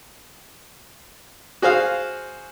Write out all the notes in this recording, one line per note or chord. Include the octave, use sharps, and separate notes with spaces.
F#4 G#4 C5 F5